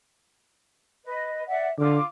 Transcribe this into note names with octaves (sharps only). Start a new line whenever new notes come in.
B4 D#5
D5 E5 F#5
D3 F4 D6